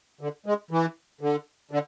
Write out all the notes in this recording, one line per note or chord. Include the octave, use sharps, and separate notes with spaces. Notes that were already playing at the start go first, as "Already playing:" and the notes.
D3
G#3
E3
D3
D3